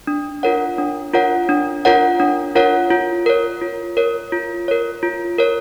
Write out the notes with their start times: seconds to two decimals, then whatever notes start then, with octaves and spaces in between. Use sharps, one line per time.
0.07 D4
0.43 F4 A#4 C#5 F#5
0.78 D4
1.13 F4 A#4 C#5 F#5
1.49 D4
1.85 F4 A#4 C#5 F#5
2.20 D4
2.55 F4 A#4 C#5 F#5
2.91 F4
3.26 A#4 C#5
3.61 F4
3.97 A#4 C#5
4.32 F4
4.68 A#4 C#5
5.03 F4
5.38 A#4 C#5